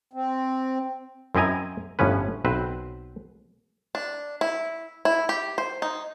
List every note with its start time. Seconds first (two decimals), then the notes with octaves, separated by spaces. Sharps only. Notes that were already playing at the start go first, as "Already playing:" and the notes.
0.13 C4
1.35 F#2 C4 E4 D#5 G#5 A#5
1.99 G1 A2 F3 C#4 B4
2.45 B1 C4 B4 C5
3.95 D4
4.41 E4
5.05 E4
5.29 G4
5.58 C5
5.82 D#4